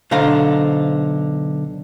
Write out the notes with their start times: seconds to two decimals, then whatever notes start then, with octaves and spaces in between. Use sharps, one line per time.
0.11 B1 D3 C5 F5 A#5